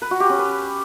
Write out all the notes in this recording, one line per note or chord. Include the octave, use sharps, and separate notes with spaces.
B4
F#4
G4
C#4
B4